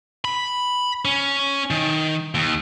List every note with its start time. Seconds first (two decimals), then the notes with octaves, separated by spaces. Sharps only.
0.25 B5
1.05 C#4
1.71 D#3
2.35 D#2